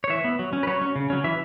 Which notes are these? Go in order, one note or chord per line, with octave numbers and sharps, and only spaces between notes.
C#5
E3 E5
B3
F#3
C#4
B4
F#3 C#5
C#4
C#3
F#3 C#4
E3 E5